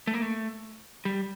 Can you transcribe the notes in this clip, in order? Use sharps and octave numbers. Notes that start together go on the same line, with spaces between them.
A3
A#3
A3
G3